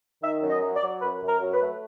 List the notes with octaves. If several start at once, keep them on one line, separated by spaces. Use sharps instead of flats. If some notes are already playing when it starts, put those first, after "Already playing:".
D#3 E5
F#2
D#5
F#3
D5
F#3
F#2 B4
F#2
A#4
F#3
B4
A3